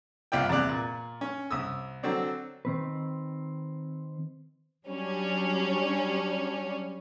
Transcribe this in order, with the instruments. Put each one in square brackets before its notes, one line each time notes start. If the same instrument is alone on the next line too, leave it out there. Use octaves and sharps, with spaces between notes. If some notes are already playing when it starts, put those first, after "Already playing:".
[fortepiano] C2 F4 D5 G5
E2 C3 D5 F#6
A#2
C#4
C2 D#6 E6
D3 F#3 C4 D4
[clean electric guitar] D#3 C4 B4
[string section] F#3 G3 C#4 D4